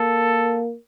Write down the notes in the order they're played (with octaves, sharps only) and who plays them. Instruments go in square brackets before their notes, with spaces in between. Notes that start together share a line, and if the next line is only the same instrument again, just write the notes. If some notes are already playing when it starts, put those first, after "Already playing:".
Already playing: [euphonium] A#3 [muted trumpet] A4